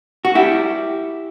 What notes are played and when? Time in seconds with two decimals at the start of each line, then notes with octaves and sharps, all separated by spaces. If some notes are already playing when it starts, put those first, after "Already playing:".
0.25 F#4
0.35 E4 G4